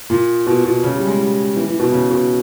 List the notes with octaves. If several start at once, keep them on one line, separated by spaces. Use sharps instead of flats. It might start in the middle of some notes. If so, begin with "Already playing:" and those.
A#2
B2
B2
C#3
G3
G#3
G3
E3
E3
B2
C#3
B2